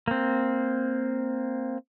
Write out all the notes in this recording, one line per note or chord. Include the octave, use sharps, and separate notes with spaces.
A#3 C4